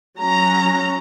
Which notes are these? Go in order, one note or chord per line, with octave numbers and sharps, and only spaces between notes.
F#3 C#4 A#5